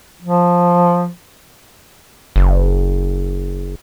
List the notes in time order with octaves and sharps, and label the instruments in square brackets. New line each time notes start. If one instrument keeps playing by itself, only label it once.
[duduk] F3
[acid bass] F#1